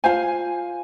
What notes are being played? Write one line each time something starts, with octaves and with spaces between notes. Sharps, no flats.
F4 C5 F5 G#5